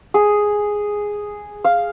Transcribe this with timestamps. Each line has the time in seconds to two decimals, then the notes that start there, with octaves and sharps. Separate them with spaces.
0.14 G#4
1.64 F5